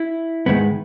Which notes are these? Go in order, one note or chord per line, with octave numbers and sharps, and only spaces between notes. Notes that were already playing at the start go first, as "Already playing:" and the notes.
Already playing: E4
G#2 D#3 G#3 B3